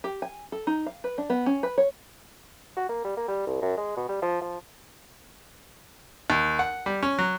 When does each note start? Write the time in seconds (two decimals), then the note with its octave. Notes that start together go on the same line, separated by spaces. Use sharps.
0.04 G4
0.22 G#5
0.52 A4
0.67 D#4
0.87 F5
1.04 B4
1.18 D4
1.30 B3
1.46 C#4
1.63 B4
1.78 C#5
2.77 F#4
2.89 A#3
3.04 G3
3.17 A#3
3.28 G3
3.47 C2
3.62 F#2
3.77 G#3
3.97 B2
4.09 G3
4.22 F3
4.41 F3
6.30 D#2
6.59 F#5
6.86 G3
7.03 C#4
7.19 F#3